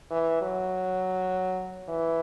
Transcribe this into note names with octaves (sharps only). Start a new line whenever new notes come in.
E3
F#3
E3